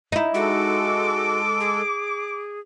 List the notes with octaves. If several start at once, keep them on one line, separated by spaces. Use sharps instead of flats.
D#4 E4
G#3 F#4 A4 D6
G#4